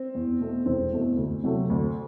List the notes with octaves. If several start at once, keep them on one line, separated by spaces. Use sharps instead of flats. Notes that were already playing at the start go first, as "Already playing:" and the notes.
Already playing: C4
E2
B2 A3
E1 C4
E2 B2 A3
D2
C3 F#3 A3
D2